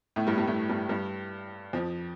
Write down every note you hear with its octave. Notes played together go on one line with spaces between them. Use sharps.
A2 A3
G2 G3
G2 G3
A2 A3
G2 G3
G2 G3
F2 F3